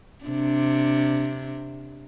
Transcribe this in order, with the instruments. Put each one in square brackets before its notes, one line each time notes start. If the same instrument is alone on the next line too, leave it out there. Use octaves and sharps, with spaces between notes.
[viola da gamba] C3 D4